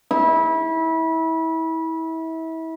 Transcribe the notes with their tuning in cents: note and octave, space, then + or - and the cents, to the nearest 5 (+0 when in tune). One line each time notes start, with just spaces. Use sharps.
E4 -30